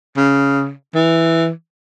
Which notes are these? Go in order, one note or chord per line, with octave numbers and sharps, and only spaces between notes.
C#3
E3